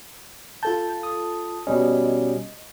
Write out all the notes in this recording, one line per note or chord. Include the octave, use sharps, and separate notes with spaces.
F4 A4 A5 G6
D#6
B2 G3 C#4 D#5